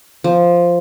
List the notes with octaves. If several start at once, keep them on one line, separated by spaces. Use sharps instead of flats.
F3